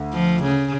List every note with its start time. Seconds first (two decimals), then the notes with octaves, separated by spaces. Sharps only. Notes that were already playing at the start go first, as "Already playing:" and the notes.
Already playing: D2
0.13 F3
0.43 C#3